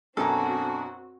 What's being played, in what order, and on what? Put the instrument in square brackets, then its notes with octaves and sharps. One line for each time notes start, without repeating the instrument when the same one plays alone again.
[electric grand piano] F#2 B2 A#5 [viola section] C4 F#4 [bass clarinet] D4 [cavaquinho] A4 G#5